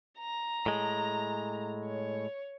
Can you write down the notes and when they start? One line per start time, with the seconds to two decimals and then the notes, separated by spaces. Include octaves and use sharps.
0.19 A#5
0.66 A2 G#3
1.86 C#5